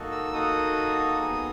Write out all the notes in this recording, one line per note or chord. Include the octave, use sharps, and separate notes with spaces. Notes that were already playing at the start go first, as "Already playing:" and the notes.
Already playing: A#3 D#4 F#4 A4
E6
A#3 D#4 F#4 A4 D#6
B3 D#4 G#4 D#6